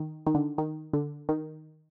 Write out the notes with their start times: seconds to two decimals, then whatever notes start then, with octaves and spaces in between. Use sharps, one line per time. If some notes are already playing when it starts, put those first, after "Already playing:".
Already playing: D#3
0.27 D#3
0.34 D3
0.58 D#3
0.93 D3
1.29 D#3